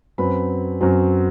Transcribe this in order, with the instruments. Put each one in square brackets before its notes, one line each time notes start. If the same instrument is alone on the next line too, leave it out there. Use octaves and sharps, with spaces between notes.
[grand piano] F#2 F#3 C4 B4 B5
F#2 F#3 C4